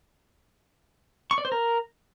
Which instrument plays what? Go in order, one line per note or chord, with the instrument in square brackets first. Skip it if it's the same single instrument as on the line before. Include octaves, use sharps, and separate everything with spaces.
[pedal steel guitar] C#6
D5
C5
A#4